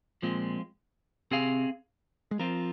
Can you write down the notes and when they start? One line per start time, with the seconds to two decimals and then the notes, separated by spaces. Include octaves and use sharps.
0.22 A#2 F3 G#3 C4
1.31 C3 C4 G#4 F5
2.31 G#3
2.39 F3 C4 F4 A#4